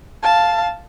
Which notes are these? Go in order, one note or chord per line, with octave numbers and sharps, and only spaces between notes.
F5 A5